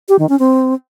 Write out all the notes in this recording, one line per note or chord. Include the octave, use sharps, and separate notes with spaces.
G4
D#3
C#4
C4